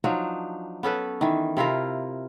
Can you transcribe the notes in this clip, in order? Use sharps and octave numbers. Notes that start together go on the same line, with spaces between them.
F3 F#3 D4 D#4
B3 C#4 A4 B4
D#3 E3
C3 E4 F4 A#4